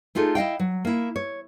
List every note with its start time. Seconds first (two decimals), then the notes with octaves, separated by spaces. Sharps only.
0.15 A3 D#4 F4 G#4 A4
0.35 E4 D#5 F5 G5
0.59 F#3
0.85 A#3 E4
1.16 C#5